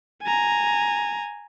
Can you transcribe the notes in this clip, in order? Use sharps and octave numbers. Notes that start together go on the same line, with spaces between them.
G#5 A#5